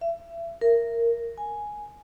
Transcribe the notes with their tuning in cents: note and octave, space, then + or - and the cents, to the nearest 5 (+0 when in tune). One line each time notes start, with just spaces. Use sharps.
E5 +30
A#4 -5
G#5 +5